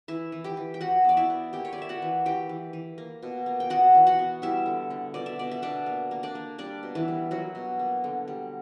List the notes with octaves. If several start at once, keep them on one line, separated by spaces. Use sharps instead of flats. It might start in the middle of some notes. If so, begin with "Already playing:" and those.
E3 E4 E5
E3
G4 G5
E3
G5
E3 F#4 F#5
B3 D5
E4 E5
B3
A#3 G4 G5
C#5
D5
A#3 E5
F#4 F#5
E3
E3 G4 G5
E3
E3
A#3
B2
A#3
G5
B3 F#4 F#5
E3
F#4 F#5
B3
G3 E4 E5
D3
D3
B2 D5
E5
B2 D5
E5
B2 D4 D5
A#3
A#3
D4 D5
A#3
G3 D4 D5
B2
E3 E4
G3
F#3 A#3 F#4
B2
A#3
D3
G3